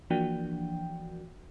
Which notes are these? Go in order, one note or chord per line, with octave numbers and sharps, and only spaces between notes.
E3 F3 A#3 D4 F#4 G5